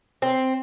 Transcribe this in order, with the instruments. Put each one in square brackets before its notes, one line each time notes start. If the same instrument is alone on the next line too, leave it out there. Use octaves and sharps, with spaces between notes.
[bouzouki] C4